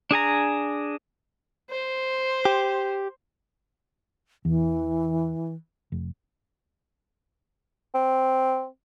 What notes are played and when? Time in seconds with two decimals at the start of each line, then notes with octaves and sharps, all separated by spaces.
0.11 D4 G#4 G#5 A#5
1.70 C5
2.45 G4
4.45 E2 E3
5.92 F1
7.95 C4